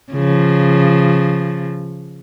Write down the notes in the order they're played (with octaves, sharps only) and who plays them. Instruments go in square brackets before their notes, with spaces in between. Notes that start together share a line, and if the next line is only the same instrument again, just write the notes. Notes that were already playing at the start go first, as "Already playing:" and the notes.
[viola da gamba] C#3 F3